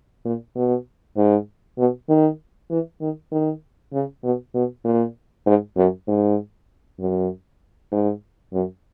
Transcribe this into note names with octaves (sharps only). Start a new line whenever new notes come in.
A#2
B2
G#2
B2
D#3
E3
D#3
D#3
C#3
B2
B2
A#2
G#2
F#2
G#2
F#2
G#2
F#2